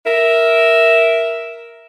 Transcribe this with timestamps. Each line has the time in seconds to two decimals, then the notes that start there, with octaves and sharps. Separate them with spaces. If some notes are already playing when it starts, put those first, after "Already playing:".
0.06 A#4 E5